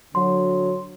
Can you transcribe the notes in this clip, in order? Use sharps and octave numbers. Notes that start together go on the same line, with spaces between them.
D3 F#3 C6